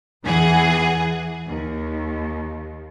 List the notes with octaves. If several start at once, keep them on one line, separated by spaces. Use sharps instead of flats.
E2 E3 G#4 F#5
D#2